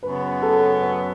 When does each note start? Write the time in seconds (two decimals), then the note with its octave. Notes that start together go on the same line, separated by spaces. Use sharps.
0.02 F#2 C#3 F#3 B3 B4
0.42 A4
0.82 B4